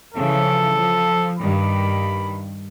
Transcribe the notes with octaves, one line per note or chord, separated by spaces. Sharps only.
C#3 E3 F3 A4
F3
G2 D#3 B5